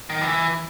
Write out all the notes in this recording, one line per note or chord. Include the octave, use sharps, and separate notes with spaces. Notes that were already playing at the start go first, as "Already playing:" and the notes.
D#3
E3